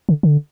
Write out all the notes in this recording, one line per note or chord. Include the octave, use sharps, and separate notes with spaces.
D3
D3